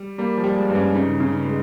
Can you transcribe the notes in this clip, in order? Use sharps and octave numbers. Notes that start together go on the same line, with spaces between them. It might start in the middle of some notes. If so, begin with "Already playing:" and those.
Already playing: G3
G3 A#3
F3
G3
G#3
G2
C#4
C#3 D#4
C#3
G#3